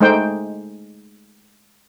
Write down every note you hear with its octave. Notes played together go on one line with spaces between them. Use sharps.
G#3 A3 D#4 C5 G5